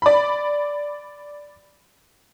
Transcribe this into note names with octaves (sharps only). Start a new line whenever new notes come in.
D5 B5